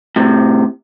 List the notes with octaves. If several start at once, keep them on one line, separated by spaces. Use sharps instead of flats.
A2 C3